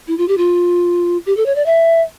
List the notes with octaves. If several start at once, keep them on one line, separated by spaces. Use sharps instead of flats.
E4
F4
G4
F4
G4
A4
C#5
D5
E5